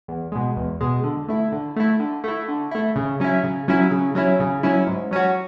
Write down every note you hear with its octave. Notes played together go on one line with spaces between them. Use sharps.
E2
B2 G#3
E2
B2 G#3
D3
A3 E4
D3
A3 E4
D3
A3 E4
D3
A3 E4
C#3
F#3 C#4 E4
C#3
F#3 C#4 E4
C#3
F#3 C#4 E4
C#3
F#3 C#4 E4
G#2
F#3 C#4 F#4